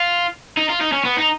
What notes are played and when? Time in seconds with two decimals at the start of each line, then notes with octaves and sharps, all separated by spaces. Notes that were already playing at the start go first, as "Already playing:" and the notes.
Already playing: F4
0.57 D#4
0.70 F4
0.81 D#4
0.93 C#4
1.05 B3
1.18 D#4